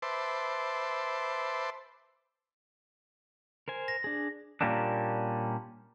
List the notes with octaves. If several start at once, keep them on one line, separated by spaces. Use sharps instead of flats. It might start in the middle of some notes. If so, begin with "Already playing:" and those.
B4 C5 E5 A5 C6 D6
A#4 C5 G#5
A#6
D4 G#4
A#2 G3 A#3 C#4 D4